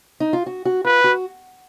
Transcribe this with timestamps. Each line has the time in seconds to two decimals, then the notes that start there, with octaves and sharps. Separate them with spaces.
0.20 D#4
0.33 F4
0.46 F#4
0.65 F#4
0.85 F4 B4
1.04 F#4